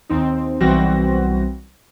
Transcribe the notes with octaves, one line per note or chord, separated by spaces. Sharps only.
D#2 C4 D#4
B1 E3 G3 C4 F#4 A#6